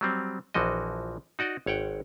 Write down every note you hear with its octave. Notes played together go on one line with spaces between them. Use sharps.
F#3 G3 C4
A#1 E3 F3 F#4 D#5
D#4 F#4 D5 D#5
G#1 C#5 F#5 G5